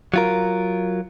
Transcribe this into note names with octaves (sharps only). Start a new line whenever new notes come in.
F#3 F4 A#4